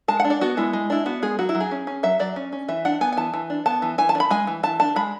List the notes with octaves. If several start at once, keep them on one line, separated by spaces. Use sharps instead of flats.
G#3 A5
F#5
D4
D5
B3 F#4
G#3 E4
G#3
D4 E4
B3 F#4
G#3 G#4
F#3 F#4
E4
F#3
G#4
C#4
C#4
F#3 E5
F#3 D5
C#4
C#4
E3 E5
D4 F#5
B3 G#5
G#5
E3 A5
E3
D4
B3 A5
E3
E3 G#5
A5
D4
B5
G#3 G#5
E3
E3 A5
D4 A5
G#3 B5